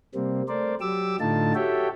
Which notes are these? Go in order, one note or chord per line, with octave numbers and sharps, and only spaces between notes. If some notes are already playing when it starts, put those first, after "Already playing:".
C3 G3 A#3 C4
A3 A#4 C5 D5
F#3 G4 D6 E6
A2 D3 A3 D#4 F4 A5
F#4 G4 A4 C#5 E5 G5